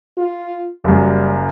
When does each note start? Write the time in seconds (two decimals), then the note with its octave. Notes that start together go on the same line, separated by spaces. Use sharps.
0.18 F4
0.84 F#1 F#2 G3